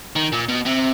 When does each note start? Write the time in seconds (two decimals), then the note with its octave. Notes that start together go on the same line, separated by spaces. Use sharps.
0.16 D#3
0.32 A#2
0.48 B2
0.66 C3